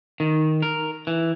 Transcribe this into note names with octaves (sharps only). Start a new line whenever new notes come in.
D#3
A#4
E3